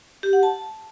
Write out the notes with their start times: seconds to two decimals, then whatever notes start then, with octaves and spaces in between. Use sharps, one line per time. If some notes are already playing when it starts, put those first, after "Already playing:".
0.23 G4
0.33 F#5
0.43 A5